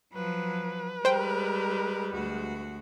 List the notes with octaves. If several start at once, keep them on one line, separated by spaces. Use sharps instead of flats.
F3 F#3 B4
G3 G#3 A#4 C5 G5
D2 F#4